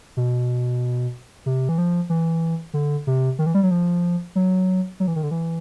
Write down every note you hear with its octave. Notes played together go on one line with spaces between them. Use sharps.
B2
C3
E3
F3
E3
D3
C3
D#3
E3
G3
F#3
F3
F#3
F#3
E3
D#3
D3
E3